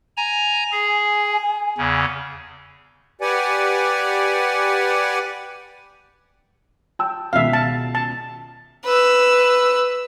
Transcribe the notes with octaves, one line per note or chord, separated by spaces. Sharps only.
G#5 A#5
G#4 G#5
E2 C#3
G4 B4 D5 F#5 G#5
G5 A5 E6
C#2 B2 D#3 E5 F5
A5
A5
B4 E6